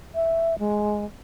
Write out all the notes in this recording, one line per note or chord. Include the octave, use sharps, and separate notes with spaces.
E5
G#3